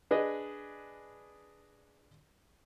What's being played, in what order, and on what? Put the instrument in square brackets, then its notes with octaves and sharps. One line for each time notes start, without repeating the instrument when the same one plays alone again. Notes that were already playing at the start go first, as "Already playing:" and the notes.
[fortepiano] D4 G#4 B4 D#5